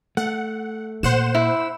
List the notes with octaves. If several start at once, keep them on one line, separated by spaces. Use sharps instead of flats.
A3 F#5
A#2 C5 F#5 E7
E4